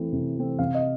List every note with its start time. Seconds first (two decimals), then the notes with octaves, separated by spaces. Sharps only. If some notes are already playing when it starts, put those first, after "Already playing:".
Already playing: E3 A3 C4
0.13 C3
0.36 E3 A3 C4
0.59 C3 F5
0.75 D#5